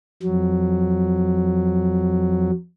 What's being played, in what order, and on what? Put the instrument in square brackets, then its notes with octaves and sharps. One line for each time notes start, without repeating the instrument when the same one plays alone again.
[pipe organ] F2 F#3